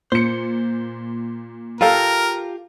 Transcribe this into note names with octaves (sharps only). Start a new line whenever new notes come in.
A#2 C5 C#7
F4 G4 A4 A#4 F5